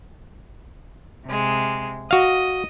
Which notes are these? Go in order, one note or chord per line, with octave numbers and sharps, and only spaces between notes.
C3 G#3
F#4 D#5 F5